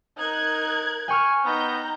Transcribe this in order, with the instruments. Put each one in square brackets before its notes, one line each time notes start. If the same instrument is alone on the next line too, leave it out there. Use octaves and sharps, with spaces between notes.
[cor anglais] D#4 [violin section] A#4 F#6 G#6
[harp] G5 C#6 F6 [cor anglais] G#5
[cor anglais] B3 [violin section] D#4 A#5 G6